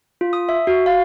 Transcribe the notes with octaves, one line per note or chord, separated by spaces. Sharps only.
F4
D#6
E5
F#4
F5